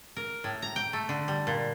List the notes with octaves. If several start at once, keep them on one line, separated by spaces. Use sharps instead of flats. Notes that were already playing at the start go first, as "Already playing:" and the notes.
A#4
A2
A#5
G5
A3
D3
G3
A#2